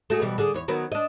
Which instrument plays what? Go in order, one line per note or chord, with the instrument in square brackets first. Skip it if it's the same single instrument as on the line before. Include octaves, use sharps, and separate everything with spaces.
[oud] A3 F#4 G#4
B2 E3 G3
D3 G#4
E2 C#5
D#3 F#3 B3
D4 D#5